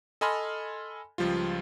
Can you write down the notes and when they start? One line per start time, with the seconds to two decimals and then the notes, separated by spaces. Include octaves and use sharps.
0.21 A4 D#5 G#5 B5 C6 F6
1.18 C#2 F3 G3 F4